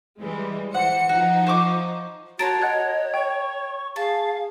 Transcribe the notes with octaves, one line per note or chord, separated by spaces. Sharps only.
E3 G3 G#3
E3 C5 F#5 C#7
F3 D#4 F#4
C5 C#6 D6
F#4 A#4 C#5 A5 C6 A6 D7 E7
D#5 F#5 F#6 G#6
G5 C#6
G#4 F5 A5